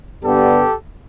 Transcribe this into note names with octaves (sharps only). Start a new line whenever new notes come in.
G2 D3 G3 B3 G4 A4